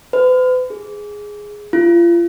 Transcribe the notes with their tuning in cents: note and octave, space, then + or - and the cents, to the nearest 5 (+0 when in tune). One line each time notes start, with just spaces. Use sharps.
B4 +45
G#4 +0
F4 -35